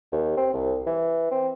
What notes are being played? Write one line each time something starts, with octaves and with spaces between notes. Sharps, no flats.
D#2
C4
C2
E3
C4